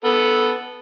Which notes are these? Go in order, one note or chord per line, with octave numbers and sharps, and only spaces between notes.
B3 A4